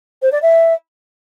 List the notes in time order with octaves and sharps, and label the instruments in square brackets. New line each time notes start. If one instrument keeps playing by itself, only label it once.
[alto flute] C5
D5
E5